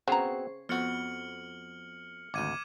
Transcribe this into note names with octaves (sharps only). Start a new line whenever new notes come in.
C#3 B3 C4 F#4 G#4 C5 A#5 C#6
F2 B3 F#4 F6 C#7 F#7
G#1 D2 D6 G#6 D#7